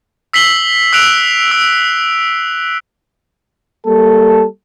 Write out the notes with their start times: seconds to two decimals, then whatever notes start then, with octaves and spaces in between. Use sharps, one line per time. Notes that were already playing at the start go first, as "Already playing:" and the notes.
0.33 E6 B6 C7 F#7 G7
0.93 E6 F#6 D7 F7 F#7
1.51 E6
3.86 G3 A#3 A4